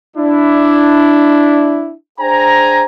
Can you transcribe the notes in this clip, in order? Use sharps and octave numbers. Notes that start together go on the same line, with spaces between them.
D4 E4
D4 G#4 C5 G5 G#5 A#5